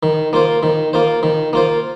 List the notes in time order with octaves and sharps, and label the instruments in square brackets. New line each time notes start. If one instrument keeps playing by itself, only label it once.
[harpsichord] D#3
A#3 F4 C5
D#3
A#3 F4 C5
D#3
A#3 F4 C5